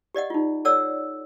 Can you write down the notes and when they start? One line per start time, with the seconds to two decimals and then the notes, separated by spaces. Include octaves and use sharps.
0.15 G4 D5 D#5 F#5
0.30 D#4 F4
0.65 A4 C#5 D5 F#5 E6